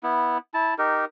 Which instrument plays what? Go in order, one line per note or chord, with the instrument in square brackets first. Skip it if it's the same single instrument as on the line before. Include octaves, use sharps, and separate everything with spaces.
[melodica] B3 E4
E4 A5
D#4 G4 A#4